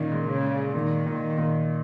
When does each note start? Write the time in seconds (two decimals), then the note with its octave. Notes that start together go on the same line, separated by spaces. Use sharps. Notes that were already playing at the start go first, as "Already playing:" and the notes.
Already playing: A#2 D#3 C#4
0.12 G#3
0.28 C#3
0.43 G#3
0.75 A#2 D#3
1.06 A#2
1.38 A#2